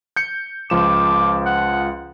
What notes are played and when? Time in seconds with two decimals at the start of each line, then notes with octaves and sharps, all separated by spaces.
0.16 G6 C#7
0.70 C#2 F3 D6 E7
1.46 F#5